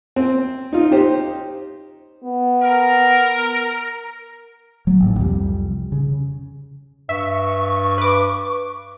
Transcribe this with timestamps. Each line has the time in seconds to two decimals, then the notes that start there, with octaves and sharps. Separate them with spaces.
0.16 C4
0.73 D#4 F4
0.91 D#4 G4 C5
2.24 B3
2.62 A#4
4.87 F3 F#3 A#3
5.00 A1 G#2
5.19 C2 F2 G3
5.92 C#3
7.09 G2 E5 C#6
7.98 B4 D6